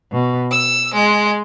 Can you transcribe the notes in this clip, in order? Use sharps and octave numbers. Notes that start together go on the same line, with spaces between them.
B2
E6
G#3